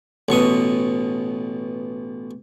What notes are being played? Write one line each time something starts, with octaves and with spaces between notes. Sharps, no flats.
A1 B2 C#6 D#6